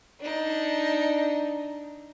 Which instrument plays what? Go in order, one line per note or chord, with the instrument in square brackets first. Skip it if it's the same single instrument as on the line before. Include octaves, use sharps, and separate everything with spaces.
[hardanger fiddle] D4 D#4